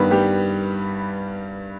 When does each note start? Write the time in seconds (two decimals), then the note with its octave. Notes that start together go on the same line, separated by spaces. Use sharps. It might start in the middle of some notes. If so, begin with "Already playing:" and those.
Already playing: G2 D#3 G3 B3 B4
0.11 G3 G4